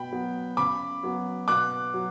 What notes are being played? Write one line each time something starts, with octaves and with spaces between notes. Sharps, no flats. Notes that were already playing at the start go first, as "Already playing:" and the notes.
Already playing: B2 G5 B5
F#3 B3
C#3 B5 D6
F#3 B3
B2 D6 F#6
F#3